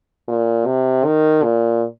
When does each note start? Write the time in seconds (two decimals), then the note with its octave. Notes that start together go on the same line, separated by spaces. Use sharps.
0.28 A#2
0.66 C3
1.05 D#3
1.43 A#2